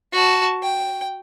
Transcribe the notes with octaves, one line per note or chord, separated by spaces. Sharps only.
F#4 A5
G5